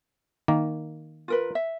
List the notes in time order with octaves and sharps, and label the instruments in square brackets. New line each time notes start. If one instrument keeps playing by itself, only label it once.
[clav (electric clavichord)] D#3 A#3
[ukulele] F4 A#4 B4
E5